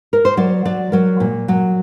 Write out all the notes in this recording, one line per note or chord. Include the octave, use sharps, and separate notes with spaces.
A#4
C5
F#3 D5
F#3 D5
F#3 A#4
A#2
F#3